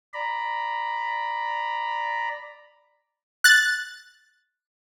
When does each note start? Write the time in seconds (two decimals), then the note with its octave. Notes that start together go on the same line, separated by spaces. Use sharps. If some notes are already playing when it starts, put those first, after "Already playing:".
0.14 D5 A#5 B5
3.44 F#6 A6